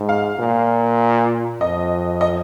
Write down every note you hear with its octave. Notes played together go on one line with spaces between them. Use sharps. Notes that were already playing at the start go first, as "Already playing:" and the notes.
Already playing: G#2
F5
A#2
F2 D#5
D#5